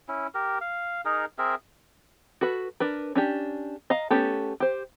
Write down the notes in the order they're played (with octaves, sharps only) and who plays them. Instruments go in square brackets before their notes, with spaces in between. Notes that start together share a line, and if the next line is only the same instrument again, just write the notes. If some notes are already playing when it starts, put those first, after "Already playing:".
[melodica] C#4 E4
G4 A#4
F5
D#4 G#4 A#4
C4 G#4 A#4 E5
[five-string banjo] F#4 A4 B4
D4 A#4 B4
C#4 D4 G4
D#5 F5 A#5
A3 B3 C#4 G4 A4
G4 C5